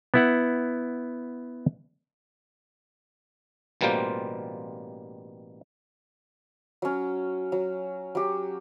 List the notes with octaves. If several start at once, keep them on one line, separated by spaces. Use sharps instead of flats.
B3 E4 F#5
A1 B2 G3 A#3 F4 C5
F#3 C#4
F#3
F#3 G4